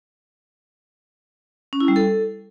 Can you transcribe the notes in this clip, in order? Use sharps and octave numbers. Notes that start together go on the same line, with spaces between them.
C#4
E4
G3
A4